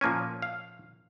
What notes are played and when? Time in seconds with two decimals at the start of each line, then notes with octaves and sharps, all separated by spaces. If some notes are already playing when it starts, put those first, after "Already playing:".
0.01 A#2 F3 A#3 C#4 G#5
0.42 F5